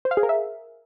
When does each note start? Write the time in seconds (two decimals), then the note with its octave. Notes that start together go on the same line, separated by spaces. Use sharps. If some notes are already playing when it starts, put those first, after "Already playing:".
0.05 C5
0.11 F5
0.17 G#4
0.23 A#4
0.29 E5